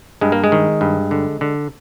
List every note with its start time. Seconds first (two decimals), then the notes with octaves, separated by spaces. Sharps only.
0.21 G2 G#3
0.32 A#3
0.44 G#3
0.52 D#3
0.81 G2
1.11 D3
1.41 D3